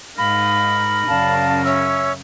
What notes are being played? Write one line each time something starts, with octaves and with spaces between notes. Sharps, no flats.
G#2 D#4 A#4 F5 B5
F#2 C#3 D5 F5 A5
C#4 C#5 E5 E6